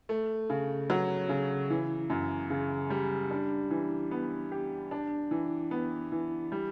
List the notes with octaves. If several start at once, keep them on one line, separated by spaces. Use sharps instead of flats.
A3
C#3
F#3
C#3
E3
F#2
C#3
G3
D4
E3
B3
G4
D4
E3
B3
E3
G3